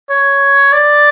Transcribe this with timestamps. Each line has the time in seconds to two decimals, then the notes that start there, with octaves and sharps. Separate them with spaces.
0.10 C#5
0.73 D5